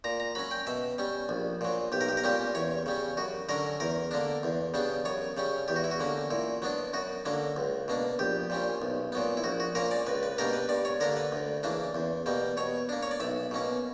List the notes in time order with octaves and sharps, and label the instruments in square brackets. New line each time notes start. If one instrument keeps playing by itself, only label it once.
[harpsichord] A#2 A#5
A#5
F#3 C#4 B5
G5
B2 E5
G3 C#4
A#1
A#2 F#3
B1 G4
A#4
G4
A#4
A#2 G3 A#3 C#4 G4
E2 C#5
C#3 G3 C#4
F#2 F#4
D3 F#3 C#4 A#4
E2 A#4
D3 A#3 D4
E2
C#3 G3 B3 D4
F#2 C#5
C#3 G3 C#4
E2 G4
F#4
E4
F#4
D3 A#3 C#4
A#2 E4
F#3 B3 D4
F#2 F#4
D3 F#3 A#3
C#2
B2 A#3 D4
A#1 G4
A#2 G3 C#4
B1
A#2 F#3 B3
E4
A#1 F#4
F#4
A#2 A#3 C#4 A#4
D5
C#2 B4
B4
B2 G3 A#3 D4 A#4
B4
G2 D5
C#5
D3 A#3 D4 A#4
B4
D2
C#3 E3 A#3 D4
E2
B2 G3 A#3
B2 C#5
A#3 D4
C#5
D5
B1 E5
B2 A#3 C#4